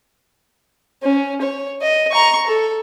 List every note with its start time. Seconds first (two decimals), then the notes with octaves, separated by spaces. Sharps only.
1.03 C#4
1.41 C#5
1.81 D#5
2.12 A#5 C#6
2.47 A4